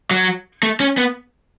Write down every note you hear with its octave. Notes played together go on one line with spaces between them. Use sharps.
F#3
A3
C#4
B3